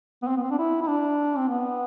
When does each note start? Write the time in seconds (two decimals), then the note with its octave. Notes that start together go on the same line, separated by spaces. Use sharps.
0.23 B3
0.28 C4
0.37 B3
0.43 C4
0.51 D4
0.59 E4
0.82 E4
0.88 D4
1.38 C4
1.48 B3